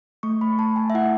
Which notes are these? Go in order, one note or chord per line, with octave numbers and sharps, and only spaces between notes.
A3 C#6
B5
A3 A5
G#5
E5
E4 F#5